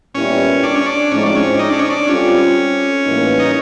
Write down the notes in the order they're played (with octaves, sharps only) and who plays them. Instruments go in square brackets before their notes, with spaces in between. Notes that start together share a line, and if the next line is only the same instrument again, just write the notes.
[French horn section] A#2 G3 B3 E4 [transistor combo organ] C#4
[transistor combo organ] D4
C#4
D4
[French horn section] A2 F3 G#3 C4 D#4 [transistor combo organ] C#4
[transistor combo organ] D4
C#4
D#4
D4
C#4
D4
[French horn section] G3 C4 F4 A4 [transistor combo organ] C#4
[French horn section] A2 E3 G3 A#3 D#4
[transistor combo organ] D#4